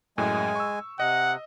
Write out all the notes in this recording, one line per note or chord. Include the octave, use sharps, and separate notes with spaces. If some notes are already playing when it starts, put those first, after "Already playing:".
F#2 A2 G#3 G#5
C#6 E6
C3 D#5 F#5